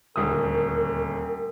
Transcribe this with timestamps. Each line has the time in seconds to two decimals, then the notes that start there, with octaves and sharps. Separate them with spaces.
0.16 D#1 D2 A#4 D#6